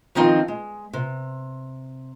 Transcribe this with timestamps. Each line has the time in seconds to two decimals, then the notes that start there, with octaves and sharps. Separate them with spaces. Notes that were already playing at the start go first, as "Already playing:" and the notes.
0.15 D#3 F3 C4 D#4 F4
0.48 G#3
0.93 C3